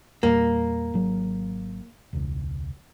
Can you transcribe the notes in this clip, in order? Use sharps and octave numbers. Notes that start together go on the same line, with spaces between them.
E2 A#2 G3 A#3
G#1 F#3
E1 C#2